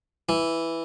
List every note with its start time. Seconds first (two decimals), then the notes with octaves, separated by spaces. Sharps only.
0.29 E3